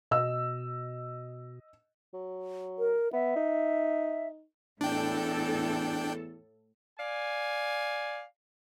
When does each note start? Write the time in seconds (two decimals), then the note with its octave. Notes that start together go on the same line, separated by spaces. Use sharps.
0.11 B2 D#5 E6
2.13 F#3
2.79 A#4
3.13 B3 E5
3.36 D#4
4.81 E2 A2 D4 A4 G5
6.98 D5 F5 G#5